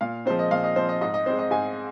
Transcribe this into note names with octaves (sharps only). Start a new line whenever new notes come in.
A#2 F5
F3 G#3 C4 C5
D#5
A#2 F5
D#5
F3 G#3 C4 C5
D#5
G#2 D#5
D#5
G#3 C4 C5
D#5
G#2 G#5